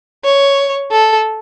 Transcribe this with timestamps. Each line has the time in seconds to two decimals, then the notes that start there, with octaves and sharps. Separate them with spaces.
0.24 C#5
0.92 A4